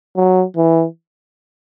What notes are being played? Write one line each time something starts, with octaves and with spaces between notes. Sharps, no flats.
F#3
E3